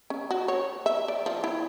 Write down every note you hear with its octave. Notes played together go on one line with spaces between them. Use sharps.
C#4
F#4
C#5
E5
D5
F3
E4